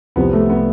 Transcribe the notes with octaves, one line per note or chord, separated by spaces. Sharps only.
C2 C3 F3 B3
A3
B3